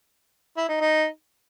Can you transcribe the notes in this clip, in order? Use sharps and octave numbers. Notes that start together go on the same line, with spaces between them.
E4
D#4
D#4